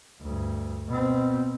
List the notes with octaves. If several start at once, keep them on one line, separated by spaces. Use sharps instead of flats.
D2 G2
B2 C4